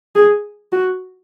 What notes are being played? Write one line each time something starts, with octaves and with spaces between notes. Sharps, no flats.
G#4
F#4